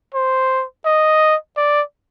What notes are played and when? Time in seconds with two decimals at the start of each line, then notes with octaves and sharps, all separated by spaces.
0.14 C5
0.85 D#5
1.57 D5